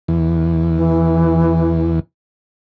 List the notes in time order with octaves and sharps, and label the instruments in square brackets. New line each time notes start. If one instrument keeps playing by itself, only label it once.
[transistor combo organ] E2
[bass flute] E3